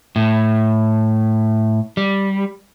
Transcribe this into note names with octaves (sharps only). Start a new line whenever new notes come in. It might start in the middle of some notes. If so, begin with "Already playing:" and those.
A2
G3